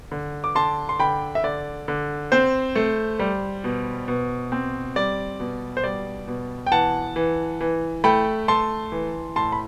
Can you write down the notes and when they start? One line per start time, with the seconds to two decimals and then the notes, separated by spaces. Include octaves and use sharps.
0.11 D3
0.44 D6
0.55 D3 A5 C6
0.89 C6
0.99 D3 G5 B5
1.35 E5
1.44 D3 D5
1.88 D3
2.32 C4 C5
2.75 A3
3.19 G3
3.64 B2
4.08 B2
4.52 C4
4.96 G3 D5
5.40 B2
5.77 C5
5.84 G3 D5
6.28 B2
6.67 G5
6.71 E3 F#5 A5
7.16 E3
7.61 E3
8.04 A3 G5 B5
8.48 A3 A5 C6
8.92 E3
9.36 A2 A5 C6
9.52 B5